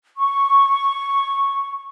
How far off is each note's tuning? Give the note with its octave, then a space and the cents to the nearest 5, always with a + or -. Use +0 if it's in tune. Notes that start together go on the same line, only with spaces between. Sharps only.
C#6 -5